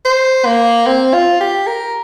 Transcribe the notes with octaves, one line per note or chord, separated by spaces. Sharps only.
C5
A#3
C4
F4
G4
A#4